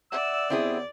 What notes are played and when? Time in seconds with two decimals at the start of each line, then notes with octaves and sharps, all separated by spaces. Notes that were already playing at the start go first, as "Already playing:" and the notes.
0.12 D5 E5 F#5 E6
0.50 D#2 B3 C4 E4 G#4